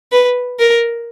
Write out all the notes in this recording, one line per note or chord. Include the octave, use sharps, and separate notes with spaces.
B4
A#4